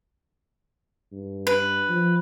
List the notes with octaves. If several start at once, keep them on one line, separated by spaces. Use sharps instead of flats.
G2
B4
F3